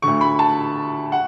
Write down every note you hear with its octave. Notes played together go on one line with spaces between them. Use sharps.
D2 D3 C#6
B5
A5
F#5